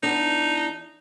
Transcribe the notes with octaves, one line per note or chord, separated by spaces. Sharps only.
E2 D4 D#4